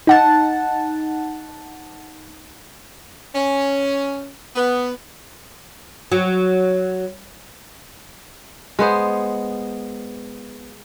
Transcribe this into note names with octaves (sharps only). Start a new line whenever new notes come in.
D#4 F#5 A5
C#4
B3
F#3
G#3 B3 C5